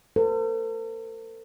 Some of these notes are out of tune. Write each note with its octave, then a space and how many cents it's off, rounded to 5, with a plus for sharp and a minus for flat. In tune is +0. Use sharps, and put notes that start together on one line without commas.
A4 +45 C5 -45